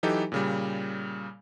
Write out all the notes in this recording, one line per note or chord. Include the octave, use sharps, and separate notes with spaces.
E3 F#3 D#4 G4 A4 B4
A#2 C#3 G3